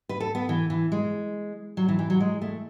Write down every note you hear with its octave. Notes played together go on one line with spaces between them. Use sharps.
B4
A4
B3
E3
E3
G#3
F#3
E3
E3
F#3
G#3
A3